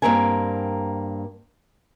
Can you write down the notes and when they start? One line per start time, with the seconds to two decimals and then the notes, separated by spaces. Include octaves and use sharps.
0.02 G2 B2 A#3 C4 A#4 G#5